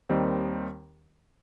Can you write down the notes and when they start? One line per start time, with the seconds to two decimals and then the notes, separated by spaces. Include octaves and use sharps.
0.09 D#2 D#3 G3 C4 D#4